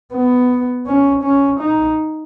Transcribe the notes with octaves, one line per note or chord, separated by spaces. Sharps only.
B3
C#4
C#4
D#4